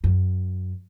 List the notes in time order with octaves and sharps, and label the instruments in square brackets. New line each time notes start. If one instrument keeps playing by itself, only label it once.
[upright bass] F#2